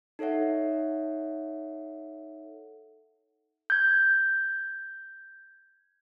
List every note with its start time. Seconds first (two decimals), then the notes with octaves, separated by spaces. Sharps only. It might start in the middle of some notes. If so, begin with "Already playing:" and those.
0.19 D#4 A4 C#5 E5 F#5
3.70 G6 G#6